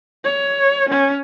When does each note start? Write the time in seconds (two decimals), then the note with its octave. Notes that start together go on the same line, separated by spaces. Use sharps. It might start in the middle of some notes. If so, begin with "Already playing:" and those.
0.25 C#5
0.89 C#4